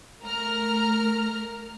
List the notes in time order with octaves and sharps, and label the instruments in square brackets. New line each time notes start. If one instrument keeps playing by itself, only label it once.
[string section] A3 A#4 A#5 F6